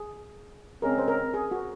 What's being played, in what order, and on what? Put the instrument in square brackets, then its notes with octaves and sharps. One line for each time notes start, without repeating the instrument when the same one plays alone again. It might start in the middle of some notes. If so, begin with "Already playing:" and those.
Already playing: [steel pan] G#4
[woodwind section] C#3 G#3 C4 [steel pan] A#4
[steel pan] C5
A#4
G#4
F#4